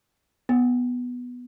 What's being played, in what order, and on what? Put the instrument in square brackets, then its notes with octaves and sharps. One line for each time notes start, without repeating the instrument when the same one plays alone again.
[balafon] B3